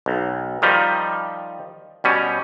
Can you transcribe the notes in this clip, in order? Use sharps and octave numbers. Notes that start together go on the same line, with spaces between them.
B1
D#3 F3 G3 D#4
B2 G3 C#4